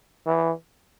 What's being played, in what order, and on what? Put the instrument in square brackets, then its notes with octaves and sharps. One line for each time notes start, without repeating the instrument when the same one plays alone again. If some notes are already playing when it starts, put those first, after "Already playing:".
[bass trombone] E3